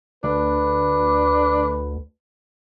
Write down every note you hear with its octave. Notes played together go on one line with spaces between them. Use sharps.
D2 D4 B4